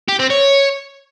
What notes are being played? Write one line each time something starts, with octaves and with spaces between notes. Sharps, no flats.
G4
C4
C#5